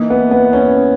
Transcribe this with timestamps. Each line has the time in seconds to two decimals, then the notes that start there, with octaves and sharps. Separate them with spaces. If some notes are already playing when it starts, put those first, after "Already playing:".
Already playing: E3 A#3 D#4
0.10 B3
0.31 B3
0.53 C#4